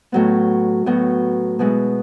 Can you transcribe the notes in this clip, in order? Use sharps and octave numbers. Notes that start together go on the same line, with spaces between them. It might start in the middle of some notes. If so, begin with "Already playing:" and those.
A2 F#3 B3
A2 F#3 B3
B2 G#3 B3 E4